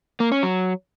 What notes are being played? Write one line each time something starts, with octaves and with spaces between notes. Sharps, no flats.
A#3
C#4
F#3